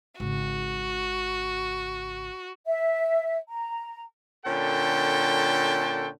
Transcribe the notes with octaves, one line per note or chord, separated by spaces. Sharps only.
G#1 C#3 F#4
E5
A#5
A#2 D3 C#4 A4 G5